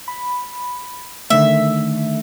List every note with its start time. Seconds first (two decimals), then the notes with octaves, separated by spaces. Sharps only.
0.08 B5
1.30 D3 D#3 A3 E5